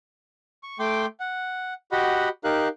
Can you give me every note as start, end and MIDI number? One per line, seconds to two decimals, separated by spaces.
0.63 0.78 85
0.79 1.06 57
0.79 1.06 79
0.79 1.06 84
0.79 1.06 86
1.20 1.74 78
1.92 2.29 66
1.92 2.29 67
1.92 2.29 75
1.92 2.29 78
1.92 2.29 83
2.44 2.68 63
2.44 2.68 67
2.44 2.68 70
2.44 2.68 77
2.44 2.68 90